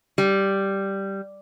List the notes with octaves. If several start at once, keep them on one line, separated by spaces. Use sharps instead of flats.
G3